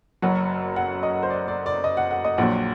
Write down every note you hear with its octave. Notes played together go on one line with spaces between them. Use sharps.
F#1 F#2 F#3 F#5
F#5
D#5
C5
D5
D5
D5
D#5
F#5
F#5
D#5
A#1 A#2 F#3 F#5